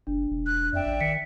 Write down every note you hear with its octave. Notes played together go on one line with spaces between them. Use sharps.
F#1 D4
E1
F#6
F2 D5 E5 G5
A1
D#3 B6 C#7